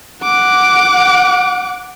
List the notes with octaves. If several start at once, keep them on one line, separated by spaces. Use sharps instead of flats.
F#5 D6